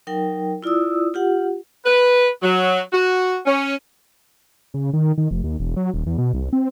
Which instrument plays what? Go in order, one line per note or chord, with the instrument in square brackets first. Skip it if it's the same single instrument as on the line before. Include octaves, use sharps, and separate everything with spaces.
[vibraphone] F#3 D#4 A#4 G5
E4 F4 D5 D#6 E6
F4 G4 F#5
[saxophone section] B4
F#3
F#4
C#4
[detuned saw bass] C#3
D#3
D#3
F1
D#2
E1
F#3
D#1
E2
B2
C2
C4